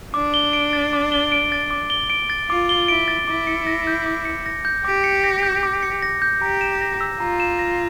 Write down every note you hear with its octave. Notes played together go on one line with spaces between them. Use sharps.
D4 D6
G7
D7
A6
D6
G7
D7
A6
D6
G7
D7
A6
F4 D6
G7
E4 D7
A6
E4 D6
C#7
A#6
G6
D6
C#7
A#6
G6
G4 D6
C#7
A#6
G6
D6
C#7
A#6
G6
G4 A#5
E7
A#6
E6
F4 A#5
E7
A#6